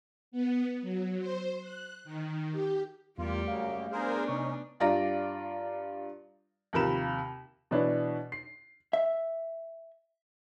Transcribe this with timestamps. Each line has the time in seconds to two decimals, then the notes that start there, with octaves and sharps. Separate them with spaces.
0.32 B3
0.82 F#3
1.19 C5
1.61 F#6
2.04 D#3
2.52 G4
3.18 E2 G3 A3 A#3 F4 G4
3.48 F#2 C#3 A#3 F5
3.92 B3 D4 G#4 A#4 C5
4.28 C3 C#4 D#4 C#6
4.80 G2 F4 D5 A#5 A#6
6.73 D#2 C3 F3 A#4 B5 E7
7.71 B2 E3 D4 B4 C#5
8.32 C7
8.93 E5